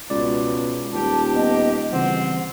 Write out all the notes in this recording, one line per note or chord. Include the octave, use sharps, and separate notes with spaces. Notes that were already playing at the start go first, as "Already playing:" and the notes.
C#2 B2 D5
D#1 G4 A5
B3 D#5
C#3 E3 G3 C4 F#5